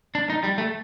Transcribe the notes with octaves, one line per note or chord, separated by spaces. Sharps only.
D4
D#4
G3
A3